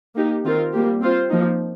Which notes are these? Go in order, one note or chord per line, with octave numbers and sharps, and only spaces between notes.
A#3 D#4 G4
D#3 C4 F4 A#4
G3 A#3 G4
C4 F4 C5
F3 A#3 D#4